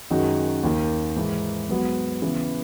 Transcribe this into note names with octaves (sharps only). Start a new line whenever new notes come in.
F#2 D#3 G#3 D#4 F#4
D#2 D#3 A#3
G#2 E3 G#3
G#2 F#3 B3 F#4
C#3 E3 B3